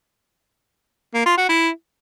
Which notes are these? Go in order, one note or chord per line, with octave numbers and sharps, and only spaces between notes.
A#3
F4
F#4
E4